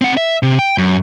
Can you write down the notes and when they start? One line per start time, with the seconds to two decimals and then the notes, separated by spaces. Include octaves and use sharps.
0.01 C4 F#5
0.17 E5
0.43 C3
0.59 G5
0.78 F#2